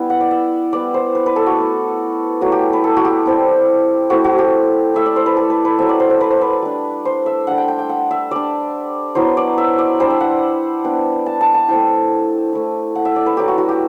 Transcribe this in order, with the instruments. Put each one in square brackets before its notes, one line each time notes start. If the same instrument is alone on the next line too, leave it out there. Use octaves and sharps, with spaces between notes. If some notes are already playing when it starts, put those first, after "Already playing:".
Already playing: [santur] G3 B3 E4
F#5
D5
E5
G3 B3 E4 D5
C5
B4
B4
A4
F#4
A3 E4
F#3 A3 E4 F#4
G4
B4
A4
F#4
G4
G3 C4 E4
A3 C4 E4 F#4
F#4
G4
A3 E4 E5
D5
C5
B4
A4
B4
B4
F#3 A3 C4 E5
D5
C5
C5
B4
C5
B4
G3 D4
C5
E5
G3 D4 F#5
G5
G5
G5
F#5
E5
G3 D4 D5
F#3 B3 E4 C5
D5
E5
D5
G3 D4 C5
E5
F#5
G3 B3 D4
A5
A5
A5
A3 C4 E4 G5
A3 E4
F#5
E5
D5
B4
F#3 A3 E4 G4
F#4
F#4
G4